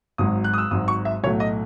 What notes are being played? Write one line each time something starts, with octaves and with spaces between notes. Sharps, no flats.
G#1 G#2 F#3 D#6
F#6
D#6
E6
G#1 G#2 F#3 D#6
C#6
E5
B1 A2 F#3 A3 C#5
D#5